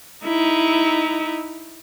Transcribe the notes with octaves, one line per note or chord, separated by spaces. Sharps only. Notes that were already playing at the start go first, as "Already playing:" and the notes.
D#4 E4